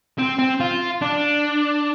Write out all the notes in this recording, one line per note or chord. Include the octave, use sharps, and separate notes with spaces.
C4
C4
F4
D4